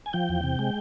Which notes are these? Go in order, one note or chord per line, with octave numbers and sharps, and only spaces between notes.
G#5
F3 G5
E2
C3
G#3